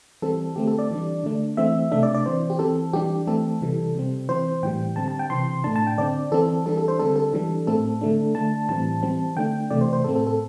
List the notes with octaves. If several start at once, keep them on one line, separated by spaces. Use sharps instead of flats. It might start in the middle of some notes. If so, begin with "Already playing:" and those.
E3 G3 C4 A4
D3 A3 C4 G4
A4
D5
E3 G3 D4
D3 A3 D4
E3 A3 C4 E5
C3 A3 D4 E5
D5
D5
E3 C4 C5
G4
E3 C4 A4
E3 G3 D4 G4
E3 A3 C4 A4
C3 E3 G3
C3 G3 C4
E3 C4 C5
A2 E3 G3 G5
D3 G3 C4 A5
A5
G5
C3 E3 C4 C6
A2 A3 D4 A5
A5
G5
D3 C4 D5
E3 C4 A4
E3 G3 D4 A4
A4
C5
D3 G3 C4 A4
A4
E3 G3 D4
A2 A3 C4 A4
D3 A3 D4
D3 A3 D4 A5
A2 E3 G3 C4 A5
E3 G3 C4
D3 A3 D4 G5
C3 E3 A3 D5
C5
C5
A2 A3 C4 A4
A4
A4